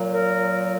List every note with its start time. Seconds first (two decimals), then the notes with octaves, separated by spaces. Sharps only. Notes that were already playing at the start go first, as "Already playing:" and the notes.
Already playing: A#2 F#3
0.12 A#4